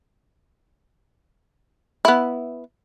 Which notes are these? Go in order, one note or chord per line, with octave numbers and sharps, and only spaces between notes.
B3 E4